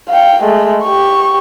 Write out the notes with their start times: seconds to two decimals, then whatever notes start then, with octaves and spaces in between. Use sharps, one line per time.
0.10 F5 G5
0.43 G#3 A3
0.83 G4 C#6